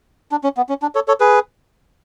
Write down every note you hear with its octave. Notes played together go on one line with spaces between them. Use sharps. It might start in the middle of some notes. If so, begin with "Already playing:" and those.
D4
C#4
B3
C#4
D4
A4 C#5
A4 C#5
G#4 B4